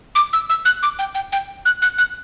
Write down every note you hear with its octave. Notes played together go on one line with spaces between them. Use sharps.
D6
E6
E6
F#6
D6
G5
G5
G5
F#6
F#6
F#6